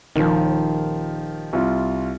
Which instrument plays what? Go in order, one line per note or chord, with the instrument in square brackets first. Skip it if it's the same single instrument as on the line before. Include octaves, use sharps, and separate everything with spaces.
[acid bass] D#1 [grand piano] D#3 F3
[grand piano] C2 F4